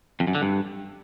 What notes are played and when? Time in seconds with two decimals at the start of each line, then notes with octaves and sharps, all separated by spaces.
0.20 F2
0.27 F#2
0.35 D3
0.42 G2